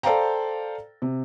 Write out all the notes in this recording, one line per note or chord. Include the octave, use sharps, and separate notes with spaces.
A4 C5 D5 F5 G5 A#5
C3